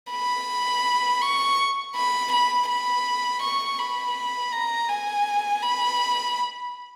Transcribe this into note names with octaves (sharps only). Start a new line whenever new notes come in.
B5
C#6
B5
B5
B5
C#6
B5
A#5
G#5
B5